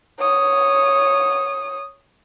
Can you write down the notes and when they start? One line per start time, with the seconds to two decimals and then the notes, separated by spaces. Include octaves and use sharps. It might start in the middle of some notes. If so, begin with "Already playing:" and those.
0.20 C#5 D#6